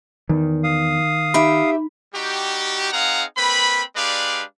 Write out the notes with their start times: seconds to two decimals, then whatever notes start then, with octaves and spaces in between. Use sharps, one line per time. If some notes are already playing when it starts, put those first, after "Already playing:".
0.29 E2 D#3
0.64 F5 D#6
1.34 D#4 G4 E5 B5
2.14 G3 D#4 F#4 G4
2.93 C4 D#4 G#4 F5 F#5 A#5
3.37 A#3 C4 B4 B5
3.96 G#3 D4 G4 B4 D5 F5